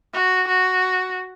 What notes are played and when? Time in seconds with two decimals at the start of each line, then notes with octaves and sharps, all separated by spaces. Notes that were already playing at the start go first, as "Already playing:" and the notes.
0.13 F#4
0.48 F#4